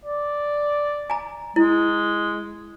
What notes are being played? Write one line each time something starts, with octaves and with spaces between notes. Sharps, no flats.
D5
G#5 A#5
G#3 E4